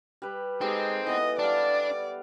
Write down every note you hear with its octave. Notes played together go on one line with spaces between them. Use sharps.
G3 B4
G#3 C4 D#4 G4 A4
E3 B3 D#5
G3 D4 D5 F5